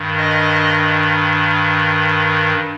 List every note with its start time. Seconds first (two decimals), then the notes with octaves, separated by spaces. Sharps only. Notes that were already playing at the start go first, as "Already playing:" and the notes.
Already playing: G2 D#3
0.18 D#5